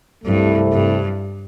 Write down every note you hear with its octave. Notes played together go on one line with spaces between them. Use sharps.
C2 G2 C3 A3 E4
G2